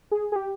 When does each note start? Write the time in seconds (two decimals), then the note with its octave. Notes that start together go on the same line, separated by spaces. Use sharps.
0.11 G#4
0.32 G#4
0.36 G4